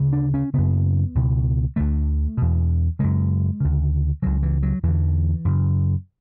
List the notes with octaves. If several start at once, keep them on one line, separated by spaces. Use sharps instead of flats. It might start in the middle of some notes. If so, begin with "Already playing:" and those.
Already playing: D2 C#3
D4
C#4
F#2 C#3 B3
C#2 B2
D2 D3 A3
E2 B2
F#2 C#3 G#3
D2 C#3
C#2 C#3 F#3
E3
F#3
E2 D3 E3
F#2 C#3